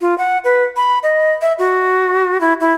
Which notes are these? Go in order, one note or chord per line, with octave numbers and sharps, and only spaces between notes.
F4
F#5
B4
B5
D#5
E5
F#4
E4
E4